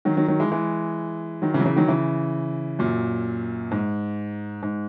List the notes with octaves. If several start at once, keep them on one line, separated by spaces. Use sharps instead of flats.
D#3 F#3
D#3 F#3
D#3 F#3
E3 G#3
E3 G#3
D#3 F#3
C#3 E3
F#3
C#3 E3
D#3 F#3
C#3 E3
F#2 A#2
G#2
G#2